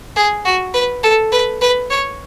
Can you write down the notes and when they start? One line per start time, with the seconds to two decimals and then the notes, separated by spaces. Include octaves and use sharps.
0.16 G#4
0.45 F#4
0.74 B4
1.03 A4
1.32 B4
1.61 B4
1.90 C#5